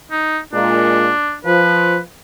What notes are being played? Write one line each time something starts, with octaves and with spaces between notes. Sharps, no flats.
D#4
A#2 G#3 D4
F3 B4